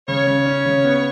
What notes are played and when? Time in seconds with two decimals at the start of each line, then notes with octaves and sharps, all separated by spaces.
0.08 C#3 C#5
0.27 C#3
0.46 C#4
0.65 C#3
0.84 B3